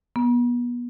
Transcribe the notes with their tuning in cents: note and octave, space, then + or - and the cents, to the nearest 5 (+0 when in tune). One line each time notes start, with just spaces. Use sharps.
B3 -30